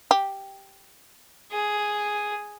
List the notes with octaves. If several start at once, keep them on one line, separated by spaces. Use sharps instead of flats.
G4
G#4